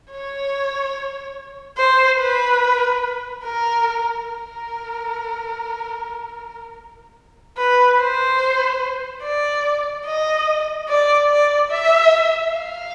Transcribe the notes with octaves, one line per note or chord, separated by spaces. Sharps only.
C#5
C5
B4
A#4
A#4
B4
C5
D5
D#5
D5
D5
E5
F5